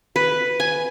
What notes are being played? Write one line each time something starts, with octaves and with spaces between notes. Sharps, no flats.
B4
G#5